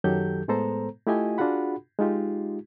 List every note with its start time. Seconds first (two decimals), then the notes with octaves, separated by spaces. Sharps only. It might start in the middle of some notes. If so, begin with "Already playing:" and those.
0.04 F#2 D#3 F#3 G4 A4 G6
0.48 A2 G#3 B3 A4 C5 A#5
1.07 A3 E4 F4 G4 D#5 G#5
1.38 D4 F4 F#4 G#4 F#5 B5
1.99 G#3 D#4 F4 G4